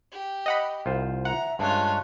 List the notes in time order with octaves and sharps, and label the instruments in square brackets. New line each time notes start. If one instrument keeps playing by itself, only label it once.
[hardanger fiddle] G4
[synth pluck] D#5 F#5 B5
[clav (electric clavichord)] C2 F4 C5
[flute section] E5 [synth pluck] F#5 [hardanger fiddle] A#5
[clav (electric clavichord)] G2 G#3 [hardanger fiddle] C#4 F4 [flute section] A5 C#6 F#6